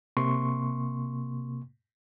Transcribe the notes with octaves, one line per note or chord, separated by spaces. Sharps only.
C3 A#3 C6 C#6